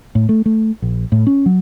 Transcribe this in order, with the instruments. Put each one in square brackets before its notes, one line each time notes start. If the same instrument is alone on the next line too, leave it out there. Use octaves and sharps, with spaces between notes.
[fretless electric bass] A2
A3
A3
A#1
A2
C#4
F#3